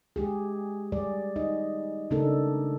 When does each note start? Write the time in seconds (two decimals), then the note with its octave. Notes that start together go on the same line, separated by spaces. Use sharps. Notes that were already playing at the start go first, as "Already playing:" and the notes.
0.16 G#3 G4 G#4
0.92 G3 G#4 D5
1.36 D#4 D#5
2.11 C#3 A3 D4 D#4 A4 A#4